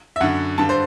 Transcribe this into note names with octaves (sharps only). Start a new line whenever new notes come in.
E5
F#2 D3 F#5
G2 D3 A5
C5